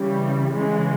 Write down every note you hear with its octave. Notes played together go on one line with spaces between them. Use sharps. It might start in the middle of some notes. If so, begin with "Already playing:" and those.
Already playing: C#3 E3 G3
C#3 E3 G#3